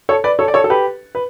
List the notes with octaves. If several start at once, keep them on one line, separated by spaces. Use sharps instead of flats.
A4 C#5
B4 D5
A4 C#5
D5
A4 C#5
A4
G4 B4
B4